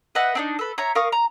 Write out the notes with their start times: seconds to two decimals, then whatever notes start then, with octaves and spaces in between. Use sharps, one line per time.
0.15 B4 D#5 E5 F#5
0.35 C4 D4 D#4
0.59 A4 B4
0.78 C#5 E5 A#5
0.95 A#4 F5 C#6 D#6
1.12 A#5